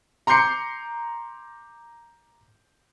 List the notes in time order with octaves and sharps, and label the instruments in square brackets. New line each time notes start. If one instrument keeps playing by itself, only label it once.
[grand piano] A#5 C6 D6 G6 C7 C#7